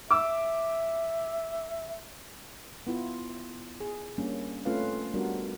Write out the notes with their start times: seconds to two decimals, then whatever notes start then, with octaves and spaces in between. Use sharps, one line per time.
0.11 E5 D6 E6
2.87 B3 E4 F4
3.80 G#4
4.18 G3 A#3 C#4 D4
4.65 A3 C4 C#4 F4 B4 F5
5.14 G3 B3 D4 F#4 A#4